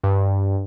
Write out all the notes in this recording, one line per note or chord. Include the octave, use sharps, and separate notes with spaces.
G2